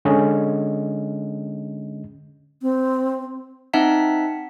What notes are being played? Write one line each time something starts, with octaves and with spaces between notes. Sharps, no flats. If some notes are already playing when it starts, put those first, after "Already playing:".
D3 G#3 C#4 D#5
C4
C4 D#4 E5 F#5 A5 B6